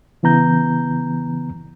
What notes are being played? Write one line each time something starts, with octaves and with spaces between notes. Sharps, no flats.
C#3 E3 B3 A#5 G6